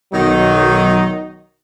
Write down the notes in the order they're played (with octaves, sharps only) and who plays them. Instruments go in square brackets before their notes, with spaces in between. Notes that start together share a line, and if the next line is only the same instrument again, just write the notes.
[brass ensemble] B1 [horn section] D#3 F#3 D#4